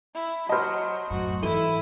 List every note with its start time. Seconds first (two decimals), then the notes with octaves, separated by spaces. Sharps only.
0.15 E4
0.49 F#3 C5 D#5 A5 B5 F6
1.10 F#2 A2 F#4
1.42 G#2 E3 E4 A4 D#7 G7